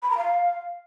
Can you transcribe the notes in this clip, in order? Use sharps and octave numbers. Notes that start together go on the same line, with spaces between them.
B5
A#5
F5